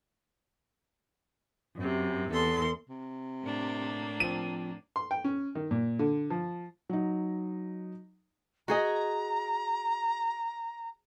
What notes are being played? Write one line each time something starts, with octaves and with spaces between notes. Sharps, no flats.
F#2 C3
E2 A4 C6
C3
A2 A#3 D4
F3 C4 D#7
C6
G5
C#4
D#3
A#2
D3
F3
F#3 D#4
F#4 G#4 D#5 A#5